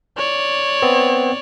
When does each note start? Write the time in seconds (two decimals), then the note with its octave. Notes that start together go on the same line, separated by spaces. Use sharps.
0.17 C#5 D5
0.82 B3 C4